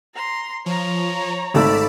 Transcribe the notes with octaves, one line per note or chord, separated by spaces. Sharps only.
A#5 C6
F3 C#5 A#5
G#1 A3 D5 A5 B5 E6